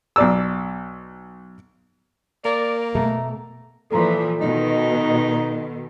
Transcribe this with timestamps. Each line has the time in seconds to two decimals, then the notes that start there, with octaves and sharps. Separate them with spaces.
0.16 B1 D5 E6
2.45 A#3 A#4 D5
2.95 B2 A3 A#5
3.91 A#2 E3 F3 A4 A#5 C6
4.41 B2 D#3 D#4